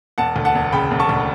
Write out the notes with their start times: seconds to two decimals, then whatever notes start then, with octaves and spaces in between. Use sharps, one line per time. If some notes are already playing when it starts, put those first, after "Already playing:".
0.18 E1 F#5 A5
0.36 D2
0.45 F#5 A5
0.55 E1
0.72 C#3 G5 B5
0.91 E1
1.00 A5 C#6
1.09 D2